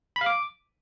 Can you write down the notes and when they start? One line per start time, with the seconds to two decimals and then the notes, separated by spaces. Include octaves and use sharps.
0.16 B5
0.21 F5
0.26 D6